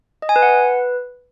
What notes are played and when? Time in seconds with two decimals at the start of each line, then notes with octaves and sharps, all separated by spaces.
0.22 D#5
0.29 G#5
0.36 B4
0.42 F#5
0.49 B4